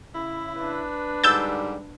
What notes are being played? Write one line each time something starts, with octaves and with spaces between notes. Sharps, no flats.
C#3 E4
D4 B4
G#2 D3 G3 E6 G6 A6